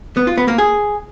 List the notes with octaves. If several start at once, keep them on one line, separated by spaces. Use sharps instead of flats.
B3
F4
B3
A#3
G#4